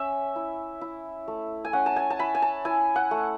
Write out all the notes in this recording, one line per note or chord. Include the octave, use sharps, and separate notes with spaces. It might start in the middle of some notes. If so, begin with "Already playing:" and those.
Already playing: C#4 E5
E4
E4
A3
G#5
C#4 F#5
A5
G#5
A5
E4 B5
G#5
A5
E4 G#5
F#5
A3